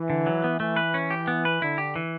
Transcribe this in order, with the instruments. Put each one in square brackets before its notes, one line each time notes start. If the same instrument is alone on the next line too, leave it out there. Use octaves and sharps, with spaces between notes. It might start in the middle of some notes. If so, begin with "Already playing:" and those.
Already playing: [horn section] E3
[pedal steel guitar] D3
F#3
B3
[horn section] E3 [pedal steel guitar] A3
[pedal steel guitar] B4
C#4
G4
B3
B4
[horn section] D3 [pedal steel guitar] E4
[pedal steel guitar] G4
E3